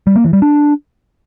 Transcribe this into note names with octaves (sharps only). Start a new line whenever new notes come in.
G3
A#3
E3
G3
D4